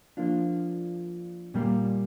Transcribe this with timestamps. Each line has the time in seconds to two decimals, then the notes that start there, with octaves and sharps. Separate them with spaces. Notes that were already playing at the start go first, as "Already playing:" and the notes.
0.17 F3 A#3 D4 F4
1.54 A#2 G3 A#3